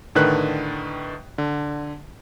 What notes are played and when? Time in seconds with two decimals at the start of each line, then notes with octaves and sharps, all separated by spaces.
0.15 A2 D3 D#3 B4 F#6
1.38 D3